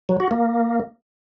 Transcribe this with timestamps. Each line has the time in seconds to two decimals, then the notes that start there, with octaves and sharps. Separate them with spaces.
0.09 F#3
0.20 F#4
0.31 A#3